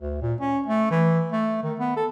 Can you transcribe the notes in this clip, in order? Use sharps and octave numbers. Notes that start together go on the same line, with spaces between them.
D2
A#2
C#4
A3
E3
A3
D#3
B3
A4